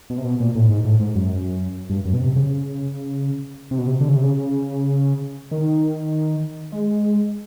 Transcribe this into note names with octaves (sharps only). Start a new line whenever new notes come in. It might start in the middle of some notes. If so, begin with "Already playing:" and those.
B2
C3
B2
A#2
A2
G#2
A2
G#2
F#2
G2
F#2
B2
C3
C#3
C3
B2
C3
D3
C#3
C3
C#3
D#3
G#3